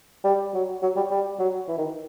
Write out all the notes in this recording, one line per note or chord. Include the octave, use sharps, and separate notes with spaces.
G3
F#3
F#3
G3
G3
F#3
E3
D#3